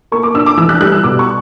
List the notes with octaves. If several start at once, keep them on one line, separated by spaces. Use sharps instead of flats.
A#3 C#6
D6
D4 E6
D6
E3 E6
F#6
G3 F#6
E6
B2 D6
C#6